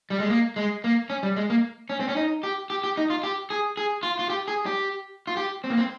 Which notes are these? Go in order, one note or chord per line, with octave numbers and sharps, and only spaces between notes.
G3
G#3
A#3
G#3
A#3
C#4
G3
G#3
A#3
C#4
C4
C#4
D#4
G4
G4
G4
D#4
F4
G4
G#4
G#4
F4
F4
G4
G#4
G4
F4
G4
C4
A#3
C4